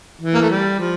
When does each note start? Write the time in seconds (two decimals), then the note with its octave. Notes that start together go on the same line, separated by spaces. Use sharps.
0.22 E3
0.34 A#3
0.42 A3
0.50 G3
0.79 F3